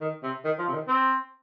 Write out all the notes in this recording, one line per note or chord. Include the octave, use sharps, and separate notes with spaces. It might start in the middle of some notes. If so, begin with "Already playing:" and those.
D#3
C3
D#3
F3
C3
D#3
C4